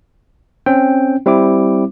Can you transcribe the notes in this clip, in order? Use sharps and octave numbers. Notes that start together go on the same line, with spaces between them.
C4 C#4 G5
G3 C4 E4 D6